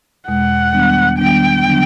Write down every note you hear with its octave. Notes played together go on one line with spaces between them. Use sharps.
E2 B2 G#3 F#5
D#3 G3 B3 D4
D#3 G3 B3 D4 G5
D3 F#3 B3 D4